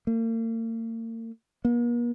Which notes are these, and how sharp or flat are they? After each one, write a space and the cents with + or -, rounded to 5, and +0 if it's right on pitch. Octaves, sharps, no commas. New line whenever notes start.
A#3 -45
A#3 +45